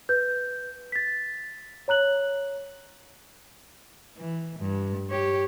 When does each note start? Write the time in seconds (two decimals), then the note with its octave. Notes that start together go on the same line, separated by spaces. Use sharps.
0.09 B4 G6
0.92 A6 B6
1.88 C#5 A#5 F#6 F#7
4.18 E3
4.59 G2
5.10 G4 C#5